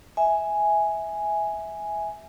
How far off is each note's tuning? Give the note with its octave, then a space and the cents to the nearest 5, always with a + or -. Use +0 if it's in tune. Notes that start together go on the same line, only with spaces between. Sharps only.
E5 -15 G#5 +0